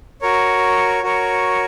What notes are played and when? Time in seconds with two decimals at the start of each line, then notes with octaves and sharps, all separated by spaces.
0.21 F#4 A#4 C#5
1.03 F#4 A#4 C#5